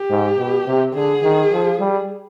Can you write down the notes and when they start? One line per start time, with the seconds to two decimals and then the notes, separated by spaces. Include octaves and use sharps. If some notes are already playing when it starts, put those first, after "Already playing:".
Already playing: G4
0.10 G#2
0.39 B2
0.67 C3
0.94 D3 G#4
1.23 D#3
1.52 F3
1.80 G3